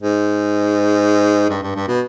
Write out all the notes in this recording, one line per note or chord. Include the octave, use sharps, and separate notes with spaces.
G#2
G2
G2
G2
B2